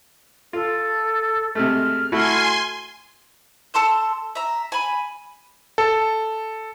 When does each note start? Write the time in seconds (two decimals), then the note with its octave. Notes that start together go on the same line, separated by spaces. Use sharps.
0.53 F4 A4
1.55 C3 G#3 A3 F6
2.12 A3 E4 F#4 G#5 C6
3.74 A4 A5 C6 E6
4.35 E5 A#5
4.72 G#5 B5
5.78 A4